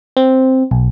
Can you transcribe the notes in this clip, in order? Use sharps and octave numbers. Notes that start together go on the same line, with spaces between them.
C4
B1